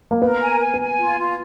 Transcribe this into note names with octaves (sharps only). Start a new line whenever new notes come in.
A#3
B3 A#4
G#5
G#5
B3
G#5
F4
F4